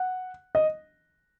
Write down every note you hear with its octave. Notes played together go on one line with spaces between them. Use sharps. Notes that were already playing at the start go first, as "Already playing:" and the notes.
Already playing: F#5
D#5